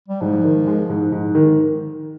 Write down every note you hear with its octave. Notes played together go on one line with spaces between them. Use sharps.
G3
G#2 F3
D#3
G#3
G#2
G#2
D#3